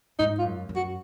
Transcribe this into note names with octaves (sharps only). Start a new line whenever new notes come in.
G#2 D#4
F4
F#2
F#2
F#4